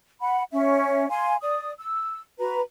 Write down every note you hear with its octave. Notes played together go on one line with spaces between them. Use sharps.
F#5 B5
C#4 E5
F5 G#5 C6
D5 D#6
E6
F#4 B4 A#5